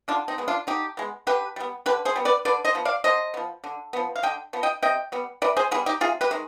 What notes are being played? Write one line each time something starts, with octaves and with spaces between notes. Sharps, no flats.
D3 D4 F4
C4 D#4
G#3 B3
D4 F4
D3 D#4 G4
G#3 B3
D3 G4 B4
G3 B3
D3 G4 B4
G#4 C5
G3 B3
B4 D5
D3 B4 D5
C5 D#5
F3 B3
D5 F5
D3 C5 D#5
F3 B3
D3
F3 B3
F5
D3 D#5 G5
F3 B3
D#5 G5
C3 D#5 G5
G3 B3
C3 B4 D5
G#4 C5
G3 B3 F4 G#4
D#4 G4
C3 F4 G#4
G4 B4
D#3 G#3